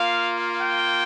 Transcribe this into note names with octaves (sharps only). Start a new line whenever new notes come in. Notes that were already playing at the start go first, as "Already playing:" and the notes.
Already playing: A#3 F4 F5
G5